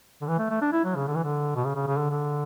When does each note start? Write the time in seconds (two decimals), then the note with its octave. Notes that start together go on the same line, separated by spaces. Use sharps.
0.21 D3
0.27 E3
0.39 A3
0.50 A3
0.61 D4
0.73 E4
0.85 F#3
0.96 C#3
1.07 D3
1.16 E3
1.24 D3
1.56 B2
1.65 C#3
1.76 C#3
1.87 C#3
1.99 D3
2.10 D3